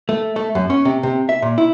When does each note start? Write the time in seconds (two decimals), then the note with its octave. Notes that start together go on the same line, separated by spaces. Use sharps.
0.09 A3
0.36 A3
0.55 F#2
0.70 C#4
0.85 C3
1.03 C3
1.29 E5
1.42 A#2
1.58 E4